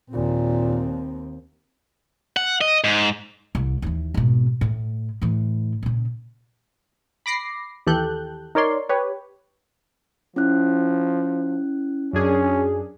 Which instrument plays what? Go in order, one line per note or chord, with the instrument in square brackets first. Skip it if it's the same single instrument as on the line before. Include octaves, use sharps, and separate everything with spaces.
[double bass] D#2 C4 [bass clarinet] A#2
[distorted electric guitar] F#5
D#5
G#2
[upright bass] C2
D#2 E3
G#1 B2
A2
A2 E3
A#2 C#3
[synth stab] B5 D6 A#6 C7
D#2 E3 G4 A4 F#6 G6
D#4 A#4 C#5 D5 C6
G4 B4 C#5
[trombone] F3 [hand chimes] C#4 E4 F#6
[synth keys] F#2 D4 G#4 [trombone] C#4